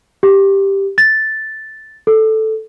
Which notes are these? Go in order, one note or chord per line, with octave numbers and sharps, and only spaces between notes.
G4
A6
A4